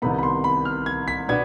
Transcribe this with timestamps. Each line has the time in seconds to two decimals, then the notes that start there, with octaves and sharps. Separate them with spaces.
0.02 C2 C3 D#3 B3 B5
0.19 B5
0.23 C6
0.44 B5
0.65 F6
0.86 G#6
1.08 B6
1.29 B2 B3 D4 G#6